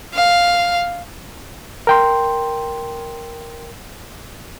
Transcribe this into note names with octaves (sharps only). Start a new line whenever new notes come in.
F5
A#4 G5 C6